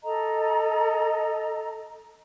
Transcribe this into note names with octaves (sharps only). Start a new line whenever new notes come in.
A4 D#5 A#5